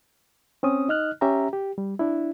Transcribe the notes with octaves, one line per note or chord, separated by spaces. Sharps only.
C4 C#4 D#6
D#4 D#5 F6 F#6
C#4 G4 E5 A#5
G4
G3
D4 E4